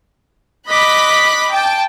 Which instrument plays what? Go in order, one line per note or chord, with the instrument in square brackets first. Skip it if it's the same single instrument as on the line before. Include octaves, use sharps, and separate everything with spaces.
[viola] D#5 D6 [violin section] B5 F#6 B6
[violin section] G5 A5